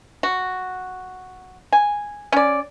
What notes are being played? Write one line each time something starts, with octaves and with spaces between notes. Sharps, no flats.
F#4
G#5
C#4 D5